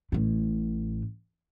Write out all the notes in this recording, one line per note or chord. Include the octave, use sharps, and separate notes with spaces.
A1 A2